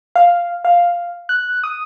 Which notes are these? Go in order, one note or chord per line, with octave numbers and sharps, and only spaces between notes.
F5
F5
F#6
D#6